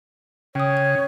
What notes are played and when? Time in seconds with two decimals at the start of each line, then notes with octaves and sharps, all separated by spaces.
0.55 C#3 C#5 G5 D#6
0.77 G#6